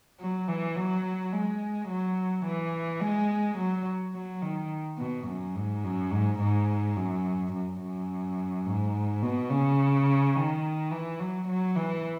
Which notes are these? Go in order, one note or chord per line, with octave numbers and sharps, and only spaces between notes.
F#3
E3
F#3
G#3
F#3
E3
G#3
F#3
F#3
D#3
B2
F#2
G#2
F#2
G#2
G#2
F#2
F#2
F#2
G#2
B2
C#3
D#3
E3
F#3
F#3
E3